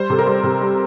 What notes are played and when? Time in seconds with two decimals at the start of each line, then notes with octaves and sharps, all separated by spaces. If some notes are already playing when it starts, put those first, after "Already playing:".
Already playing: G3 C5
0.10 C3 A4
0.19 A#4
0.26 G3 C5
0.44 C3
0.61 G3